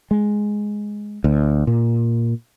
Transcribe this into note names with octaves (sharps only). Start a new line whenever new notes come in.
G#3
D2
A#2